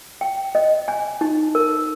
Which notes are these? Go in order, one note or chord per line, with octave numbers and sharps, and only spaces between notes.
G5
D#5
G#5
D#4
A#4